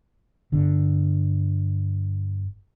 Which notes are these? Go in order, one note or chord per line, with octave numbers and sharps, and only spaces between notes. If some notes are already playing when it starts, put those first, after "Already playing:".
G1 D3